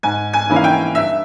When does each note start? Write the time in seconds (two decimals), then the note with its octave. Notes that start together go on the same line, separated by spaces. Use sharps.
0.03 G#2 G#5
0.33 G#5
0.49 E3 A#3 C#4 E4
0.56 F5
0.64 G5
0.95 G2 E5